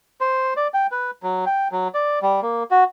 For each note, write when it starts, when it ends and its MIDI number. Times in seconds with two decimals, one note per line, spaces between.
0.21 0.54 72
0.57 0.67 74
0.74 0.87 79
0.91 1.11 71
1.23 1.45 54
1.46 1.68 79
1.72 1.88 54
1.94 2.19 74
2.22 2.40 55
2.43 2.63 58
2.71 2.84 66